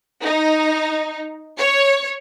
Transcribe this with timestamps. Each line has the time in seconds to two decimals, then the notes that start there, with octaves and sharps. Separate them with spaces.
0.24 D#4
1.58 C#5